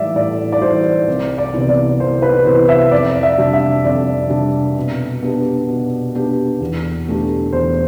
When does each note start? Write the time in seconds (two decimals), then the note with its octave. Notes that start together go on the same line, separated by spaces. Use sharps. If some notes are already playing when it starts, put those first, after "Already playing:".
Already playing: A2 E3 G3 D5 E5
0.16 A2 D5
0.52 D5
0.61 E3 G3 C5
1.08 C2
1.38 D5
1.54 C3 E3 B3 E4
1.69 D5
2.00 C2 C5
2.22 B4
2.46 C3 E3 B3 E4 C5
2.69 E5
2.91 F2 D5
3.23 E5
3.38 C3 G3 D4
3.53 E5
3.84 F2 D5
4.30 C3 G3 D4
4.76 B2
5.23 B3 D4 G4
5.68 B2
6.15 B3 D4 G4
6.60 E2
7.07 B2 A3 D4 G4
7.53 E2 C5